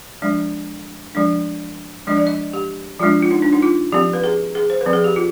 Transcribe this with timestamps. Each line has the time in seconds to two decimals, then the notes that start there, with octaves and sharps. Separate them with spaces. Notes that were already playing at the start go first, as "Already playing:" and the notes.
0.22 F3 G#3 D4
1.15 F3 G#3 D4
2.07 F3 G#3 D4 D#5
2.17 D5
2.27 D#5
2.53 G4
3.00 F3 G#3 D4 F4
3.22 F4
3.31 D#4
3.42 D4
3.53 D#4
3.62 F4
3.92 F3 C4 G4
4.13 B4
4.24 G#4
4.55 G#4
4.70 C5
4.81 B4
4.86 F3 C4
4.93 G#4
5.04 G4
5.16 F4